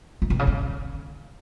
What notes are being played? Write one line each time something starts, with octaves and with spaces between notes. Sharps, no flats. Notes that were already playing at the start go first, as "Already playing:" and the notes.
A2
B2
C#3
D3